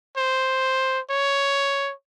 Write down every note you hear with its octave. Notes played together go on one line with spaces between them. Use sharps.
C5
C#5